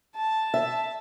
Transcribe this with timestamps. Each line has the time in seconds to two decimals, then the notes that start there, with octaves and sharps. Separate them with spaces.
0.16 A5
0.54 E5